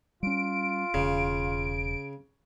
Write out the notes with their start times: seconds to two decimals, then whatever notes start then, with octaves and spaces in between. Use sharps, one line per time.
0.23 G3 C#4 F4 D7
0.94 E1 C#3